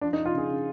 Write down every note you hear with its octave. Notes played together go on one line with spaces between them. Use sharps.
F3 D4
D#4
F3
F4
C#3 G#4
C#3